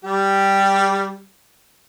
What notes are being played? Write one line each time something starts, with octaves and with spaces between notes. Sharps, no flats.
G3 G4